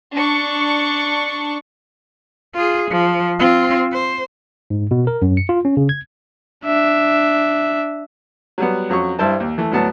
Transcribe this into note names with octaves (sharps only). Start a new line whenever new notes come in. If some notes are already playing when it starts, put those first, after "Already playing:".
D4 C#6
F4 G#4
F3
C4 F4
C5
G#2
B2
A#4
F#2
C#7
F4
C#4
C#3
G#6
D4 E5
F#3 G3 B3
F2 F#3 C#4 C#6
G2 E4 C5 A5
D#2
E3 A3
D2 A2 F#3 B3 A5